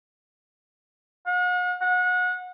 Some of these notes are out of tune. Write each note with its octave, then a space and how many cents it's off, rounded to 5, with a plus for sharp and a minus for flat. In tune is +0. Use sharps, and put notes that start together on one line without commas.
F#5 -45
F#5 -30